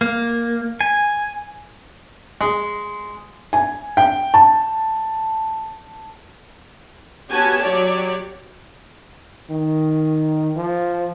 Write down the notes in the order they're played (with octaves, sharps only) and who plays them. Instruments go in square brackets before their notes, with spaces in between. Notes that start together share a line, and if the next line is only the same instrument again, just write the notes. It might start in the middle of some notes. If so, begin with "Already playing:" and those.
[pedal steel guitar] A#3
G#5
[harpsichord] G#3
[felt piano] G#5
G5
A5
[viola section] B3 C#4 F#4 G4 G#5 A5
F#3 G4 C#5 D5
[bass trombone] D#3
F3